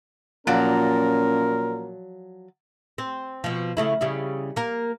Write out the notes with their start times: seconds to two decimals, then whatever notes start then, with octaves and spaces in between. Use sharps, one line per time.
0.47 A#2 F3 F#3 C#4 A#4 D5
2.98 C4
3.44 B2 F3
3.77 C#3 A3 E4
4.01 C#3 G3 E4
4.56 A#3 A#4